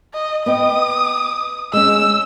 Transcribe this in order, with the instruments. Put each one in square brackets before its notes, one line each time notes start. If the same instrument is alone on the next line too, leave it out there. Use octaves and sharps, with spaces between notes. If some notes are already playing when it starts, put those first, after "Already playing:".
[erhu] D#5
[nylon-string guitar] B3 D#5 G5 [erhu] D#6
[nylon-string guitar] G#3 C#4 [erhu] E6